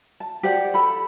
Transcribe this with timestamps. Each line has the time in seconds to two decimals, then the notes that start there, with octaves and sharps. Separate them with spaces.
0.20 A5
0.43 G4 C5 D5 F#5
0.74 A4 B5